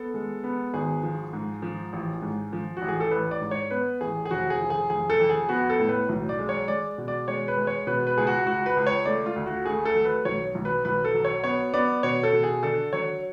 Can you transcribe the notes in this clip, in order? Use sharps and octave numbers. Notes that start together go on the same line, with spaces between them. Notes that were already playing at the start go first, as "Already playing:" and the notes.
Already playing: B3 A4
G#3
B3
G#1 G#4
F3
G#2
F3
A1
G#2
F3
F#4
A1
G#4
A4
A1 B4
D5
G#2
C#5
B3 B4
A1 G#4
G#4
F1 F#4
G#4
F3
G#4
F1 G#4
A4
F2
G#4
B3 F#4
A4
A2
B4
B1
D5
G#3
C#5
G#3 D5
B2
D5
G#3 C#5
B4
G#3
C#5
B2 B4
B4
C#2 G#4
F#4
C#2 F#4
B4
C#2
C#5
A3 D5
F4
D2
F#4
A3 G#4
A4
F#3
B4
B1 C#5
B1
B4
B1 B4
A4
F#3
C#5
B3 C#5
B3 D5
B2 C#5
A4
B2
G#4
D3 A4
F#3 C#5